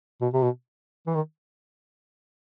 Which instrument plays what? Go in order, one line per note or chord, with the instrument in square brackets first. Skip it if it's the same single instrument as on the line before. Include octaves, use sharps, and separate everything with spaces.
[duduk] B2
C3
B2
E3
D#3